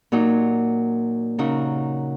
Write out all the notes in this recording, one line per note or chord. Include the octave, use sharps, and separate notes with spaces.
A#2 F#3 D#4
C#3 F#3 D#4 A#4